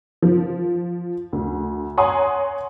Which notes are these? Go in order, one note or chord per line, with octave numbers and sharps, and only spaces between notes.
F3
D2
C#5 F#5 G#5 A#5 C6 D#6